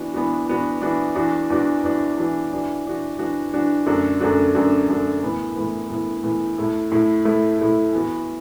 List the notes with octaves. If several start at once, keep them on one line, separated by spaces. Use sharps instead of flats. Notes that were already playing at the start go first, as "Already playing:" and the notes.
Already playing: E3 B3 D4 F#4
E3 B3 D4 F#4
E3 B3 D4 F#4
E3 B3 D4 F#4
E2 E3 D4 F#4
E2 E3 D4 F#4
E2 E3 D4 F#4
E2 E3 D4 F#4
E3 D4 F#4
E3 D4 F#4
E3 D4 F#4
E3 D4 F#4
F#2 D3 A3 D4 F#4
F#2 D3 A3 D4 F#4
F#2 D3 A3 D4 F#4
F#2 D3 A3 D4 F#4
A2 E3 B3
A2 E3 B3
A2 E3 B3
A2 E3 B3
A2 A3 E4
A2 A3 E4
A2 A3 E4
A2 A3 E4
E3 B3 F#4